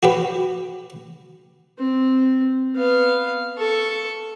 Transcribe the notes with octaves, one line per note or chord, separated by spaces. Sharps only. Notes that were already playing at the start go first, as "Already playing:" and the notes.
F#4 G4 B4
C4
B3 F5
A4 C#6